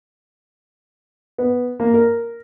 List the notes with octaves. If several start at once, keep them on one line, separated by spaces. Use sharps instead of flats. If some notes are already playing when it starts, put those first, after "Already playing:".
B3
A#3
A#4